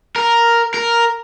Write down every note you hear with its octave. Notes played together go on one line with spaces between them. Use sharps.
A#4
A#4